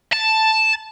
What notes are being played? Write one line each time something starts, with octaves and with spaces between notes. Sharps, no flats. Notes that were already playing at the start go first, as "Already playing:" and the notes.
A5